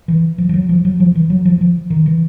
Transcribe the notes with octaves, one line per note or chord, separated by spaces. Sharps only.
E3
F3
F3
F#3
F3
F#3
F3
E3
F#3
F3
F3
D#3
E3